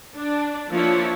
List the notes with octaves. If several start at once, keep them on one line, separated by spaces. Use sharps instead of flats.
D4
F3 A#3 D4 E4 C#5